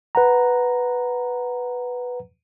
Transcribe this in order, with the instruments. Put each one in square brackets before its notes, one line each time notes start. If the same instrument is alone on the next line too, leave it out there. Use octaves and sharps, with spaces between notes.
[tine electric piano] B4 F#5 A#5